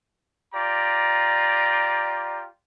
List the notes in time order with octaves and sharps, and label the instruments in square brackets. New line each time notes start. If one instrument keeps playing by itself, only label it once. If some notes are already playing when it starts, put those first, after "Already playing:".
[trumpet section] F4 G4 D5 A#5